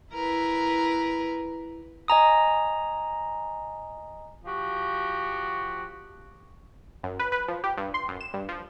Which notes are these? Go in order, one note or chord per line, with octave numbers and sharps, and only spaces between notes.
E4 A#4 B4
D#5 G#5 A#5 D#6
F3 F#4 G4
F#2
B4
B4
F3
G4
G2
C6
F#2
E7
G2
F3